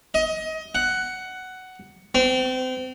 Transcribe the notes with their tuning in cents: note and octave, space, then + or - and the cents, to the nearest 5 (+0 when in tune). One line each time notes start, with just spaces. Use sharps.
D#5 +25
F#5 +10
C4 -30